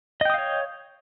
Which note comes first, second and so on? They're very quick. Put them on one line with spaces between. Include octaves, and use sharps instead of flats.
D#5 G5 D#6 F5 C#5